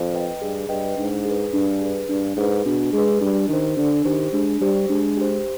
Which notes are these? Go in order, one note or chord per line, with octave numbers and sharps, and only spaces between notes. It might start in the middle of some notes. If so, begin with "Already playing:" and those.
Already playing: F2
B4 D#5 G5
G2 G#4
G2 B4 D#5 G5
G#2 D4
G#4 B4
G2 D4
G#4 B4
G2 D4
G#2 G#4 B4
B2 D4
G#3 G#4 B4
G3 D4
D#3 G4 C5
D3 D4
D#3 G4 C5
G#3 D4
G3 G4 C5
G#3 D4
G4 C5